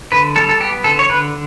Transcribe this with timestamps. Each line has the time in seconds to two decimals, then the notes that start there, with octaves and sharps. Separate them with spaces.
0.12 D3 B4
0.36 G3 A4
0.49 A4
0.60 B3 G4
0.84 D3 A4
0.99 C#5
1.09 D3 B4